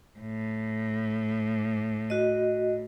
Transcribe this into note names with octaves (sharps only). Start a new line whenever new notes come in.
A2
F#4 D#5